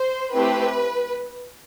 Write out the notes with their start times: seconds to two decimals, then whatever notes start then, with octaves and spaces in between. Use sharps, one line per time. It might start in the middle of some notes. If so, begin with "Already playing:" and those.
Already playing: C5
0.33 A3 C4 E4 G4 B4